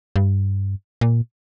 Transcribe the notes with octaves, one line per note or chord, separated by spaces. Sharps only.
G2
A#2